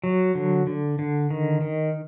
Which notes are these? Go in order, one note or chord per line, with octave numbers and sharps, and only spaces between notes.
F#3
D3
D3
D3
D#3
D#3